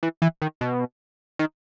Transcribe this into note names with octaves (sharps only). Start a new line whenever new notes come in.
E3
E3
D#3
B2
D#3